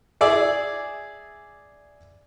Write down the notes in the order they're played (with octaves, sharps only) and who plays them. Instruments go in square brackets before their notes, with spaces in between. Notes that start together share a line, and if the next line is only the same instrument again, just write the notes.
[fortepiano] G#4 D5 E5